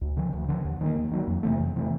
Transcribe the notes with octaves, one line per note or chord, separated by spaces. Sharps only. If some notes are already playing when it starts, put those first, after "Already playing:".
D2
D3 F3
D2
D3 F3
D#2
D#3 F#3 A#3
D#2
D#3 F#3 A#3
F2
C3 E3 A3
F2
C3 E3 A3